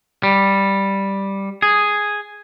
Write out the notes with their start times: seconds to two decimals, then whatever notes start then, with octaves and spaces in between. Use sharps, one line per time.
0.23 G3
1.62 G#4